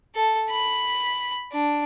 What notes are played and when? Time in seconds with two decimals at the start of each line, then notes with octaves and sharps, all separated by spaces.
0.15 A4
0.50 B5
1.53 D4